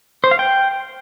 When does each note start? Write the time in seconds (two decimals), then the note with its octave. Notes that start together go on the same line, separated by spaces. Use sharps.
0.24 C5
0.31 F5
0.39 G5